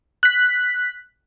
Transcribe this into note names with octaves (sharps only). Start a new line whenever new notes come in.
F#6 B6